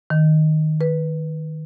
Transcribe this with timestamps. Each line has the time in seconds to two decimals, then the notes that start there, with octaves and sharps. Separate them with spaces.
0.10 D#3
0.81 B4